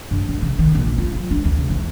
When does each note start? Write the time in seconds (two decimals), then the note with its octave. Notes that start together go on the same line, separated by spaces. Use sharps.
0.11 G2
0.29 D4
0.42 C#3
0.59 D#3
0.75 A#1
0.98 F4
1.15 F#3
1.31 D4
1.44 D2
1.58 C#3
1.70 E2